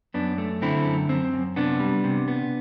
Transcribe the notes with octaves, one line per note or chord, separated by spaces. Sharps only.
F#2 B3 D4
A3
D3 C4 E4
F#2
F#2 C4
F#2
C3 B3 D4
G3
C3
B3